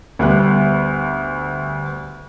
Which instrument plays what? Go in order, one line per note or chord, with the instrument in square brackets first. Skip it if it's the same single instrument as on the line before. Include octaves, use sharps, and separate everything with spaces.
[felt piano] D2 G3 B3 F#6